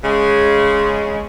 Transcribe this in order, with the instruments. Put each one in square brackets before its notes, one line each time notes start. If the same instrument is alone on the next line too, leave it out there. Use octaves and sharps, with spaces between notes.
[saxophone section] C#3 G#3